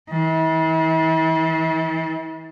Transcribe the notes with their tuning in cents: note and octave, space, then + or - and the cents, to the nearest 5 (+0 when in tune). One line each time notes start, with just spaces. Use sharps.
E3 -40